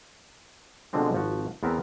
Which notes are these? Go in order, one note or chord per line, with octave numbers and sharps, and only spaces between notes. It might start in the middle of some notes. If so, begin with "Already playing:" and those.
B2 D3 F3 G#3 C4 D4
G#1 F3 F#4
E2 B3 C4 A#4 E5